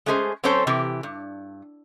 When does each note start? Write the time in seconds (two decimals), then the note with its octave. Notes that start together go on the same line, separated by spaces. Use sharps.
0.06 G#3 A3 C#4 G#4 A#4 C5
0.44 F#3 C4 C#4 A4 C5 C#5
0.67 C3 E3 G4
1.03 G2